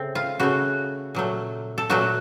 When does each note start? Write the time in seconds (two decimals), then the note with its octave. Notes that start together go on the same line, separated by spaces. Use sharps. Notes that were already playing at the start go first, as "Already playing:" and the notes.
Already playing: C#3 A3 C4
0.15 F4
0.40 C#3 A3 F#4
1.15 A#2 F#3 A3
1.78 A4
1.90 A#2 F#3 A3 F#4